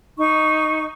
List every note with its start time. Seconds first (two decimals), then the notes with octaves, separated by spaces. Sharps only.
0.18 D#4 C#6